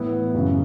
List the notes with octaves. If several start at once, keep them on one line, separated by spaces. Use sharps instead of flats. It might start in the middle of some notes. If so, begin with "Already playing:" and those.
Already playing: A2 E3 B3 E4
F#2 C#3 E3